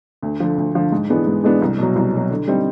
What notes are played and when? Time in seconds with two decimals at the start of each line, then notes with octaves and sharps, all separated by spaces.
0.22 D2
0.40 D3 F3
0.58 D2
0.75 D3 F3
0.92 G#2
1.09 E3 G#3 B3 D4
1.27 G#2
1.44 E3 G#3 B3 D4
1.62 C2
1.78 B2 F#3
1.96 C2
2.13 B2 F#3
2.30 D3
2.48 G3 C4 D#4